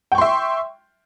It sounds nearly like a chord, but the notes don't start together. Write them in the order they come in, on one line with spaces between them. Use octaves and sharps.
G5 C#6 C6 E5